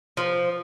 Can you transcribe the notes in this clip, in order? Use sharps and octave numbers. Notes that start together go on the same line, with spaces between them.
F3